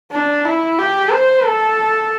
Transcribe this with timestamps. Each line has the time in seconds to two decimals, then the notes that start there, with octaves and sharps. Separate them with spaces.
0.12 D4
0.45 E4
0.79 G4
1.12 C5
1.45 A4